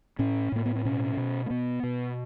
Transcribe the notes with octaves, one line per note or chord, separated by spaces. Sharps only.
A2 C#4
A2 A#3
B3
C4
B2 C#4
B2
A#3
B2 B3
B2